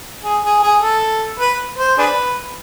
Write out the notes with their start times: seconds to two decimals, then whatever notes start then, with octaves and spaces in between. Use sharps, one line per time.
0.24 G#4
0.44 G#4
0.63 G#4
0.83 A4
1.39 B4
1.78 C5
1.98 D4 G#4 B4